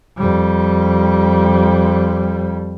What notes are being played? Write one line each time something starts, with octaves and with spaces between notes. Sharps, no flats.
F2 G3